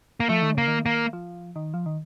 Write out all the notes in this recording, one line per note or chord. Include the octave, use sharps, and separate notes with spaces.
A#3
F3 A3
D#3
C#3 A#3
D#3
A#3
F3
D#3
F3
D#3